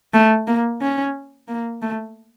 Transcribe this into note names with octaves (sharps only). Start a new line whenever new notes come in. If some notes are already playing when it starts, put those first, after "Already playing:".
A3
A#3
C#4
A#3
A3